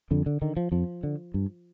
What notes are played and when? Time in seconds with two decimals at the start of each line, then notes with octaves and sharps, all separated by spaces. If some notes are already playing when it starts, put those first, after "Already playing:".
0.11 F2 D3
0.26 D3
0.42 D3 D#3
0.57 F3
0.72 F2 F3
1.03 D3
1.34 G2